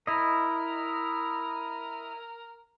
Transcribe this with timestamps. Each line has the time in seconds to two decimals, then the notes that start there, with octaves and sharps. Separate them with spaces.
0.07 E4 A#4 D#5